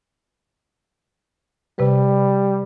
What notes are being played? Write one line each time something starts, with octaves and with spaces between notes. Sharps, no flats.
C3 G3 B4